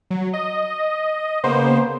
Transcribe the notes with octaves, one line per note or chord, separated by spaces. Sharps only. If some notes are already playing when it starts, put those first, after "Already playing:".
F#3
D#5
C#3 A#3 B3 C5